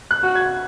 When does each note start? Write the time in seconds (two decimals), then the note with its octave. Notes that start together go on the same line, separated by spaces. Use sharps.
0.11 F#6
0.23 F#4
0.35 G#6